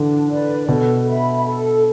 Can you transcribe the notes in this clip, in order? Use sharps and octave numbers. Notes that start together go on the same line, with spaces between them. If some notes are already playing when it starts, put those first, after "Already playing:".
Already playing: D3 E3 D4
B4 D5
B2 A4
E5 B5
A4